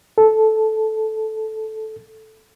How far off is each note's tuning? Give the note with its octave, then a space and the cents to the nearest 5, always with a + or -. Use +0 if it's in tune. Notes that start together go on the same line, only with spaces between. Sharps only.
A4 -10